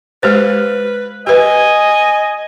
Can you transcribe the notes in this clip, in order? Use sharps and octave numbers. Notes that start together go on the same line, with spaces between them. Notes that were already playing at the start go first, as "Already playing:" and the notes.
G#3 G4 B4 C5
G4 B4 D#5 G#5